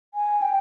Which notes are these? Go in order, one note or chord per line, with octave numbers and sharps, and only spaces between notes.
G#5
G5